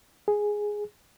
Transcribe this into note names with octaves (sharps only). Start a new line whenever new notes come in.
G#4